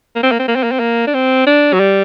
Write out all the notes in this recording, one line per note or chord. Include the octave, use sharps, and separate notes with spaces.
A#3
C4
A#3
C4
A#3
C4
A#3
C4
A#3
D4
C4
D4
F#3
G3